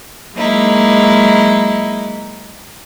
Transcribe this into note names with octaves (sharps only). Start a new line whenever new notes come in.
F#3 G#3 A#3 D#4 E4